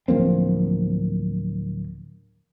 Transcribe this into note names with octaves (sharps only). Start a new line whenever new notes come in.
D1 F3 A#3 C4